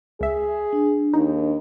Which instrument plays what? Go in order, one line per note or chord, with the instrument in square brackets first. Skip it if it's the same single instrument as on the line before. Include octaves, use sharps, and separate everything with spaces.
[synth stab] C#2 E5 [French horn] G#4
[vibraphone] D4
[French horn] D#2 [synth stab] D#4